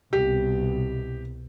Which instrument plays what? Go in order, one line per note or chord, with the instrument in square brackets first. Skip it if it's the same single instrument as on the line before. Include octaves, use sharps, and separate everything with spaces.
[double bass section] C2 B2 [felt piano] G4